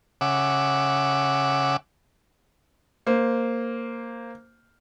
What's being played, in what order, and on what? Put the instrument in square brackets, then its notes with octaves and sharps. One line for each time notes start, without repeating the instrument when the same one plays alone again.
[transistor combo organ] C#3 E5 F#5 D6
[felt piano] A#3 C5